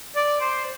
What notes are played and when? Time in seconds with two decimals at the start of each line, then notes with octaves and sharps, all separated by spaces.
0.16 D5
0.41 C5